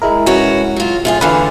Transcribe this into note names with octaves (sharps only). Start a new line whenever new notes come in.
G#3 E4 A#4
B2 C#4 F#4
F#3 F4
F#2 A3 F4 G#4
E2 D3 E3 B4 F5